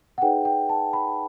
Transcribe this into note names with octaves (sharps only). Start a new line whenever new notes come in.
F#5
D#4 G#4 B4 D5 G5
G5
A5
B5